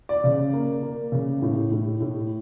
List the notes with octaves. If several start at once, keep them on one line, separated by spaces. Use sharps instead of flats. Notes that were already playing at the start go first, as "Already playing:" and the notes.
D5
C#3
A#3
A#3
C#3
A2
A2
A2